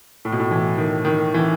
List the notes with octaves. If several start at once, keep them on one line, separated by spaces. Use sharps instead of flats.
A2
B2
A2
E3
D#3
D#3
E3